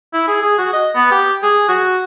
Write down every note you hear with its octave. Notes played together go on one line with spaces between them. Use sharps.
E4
G#4
G#4
F#4
D#5
B3
G4
G#4
F#4